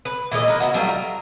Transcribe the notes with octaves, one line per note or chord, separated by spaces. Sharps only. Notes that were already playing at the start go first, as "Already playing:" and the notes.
B4
A#2 E3 G#3 D#5
A#4 B4
B3 E4 F#4
F#3 G3 A3 F4
A#5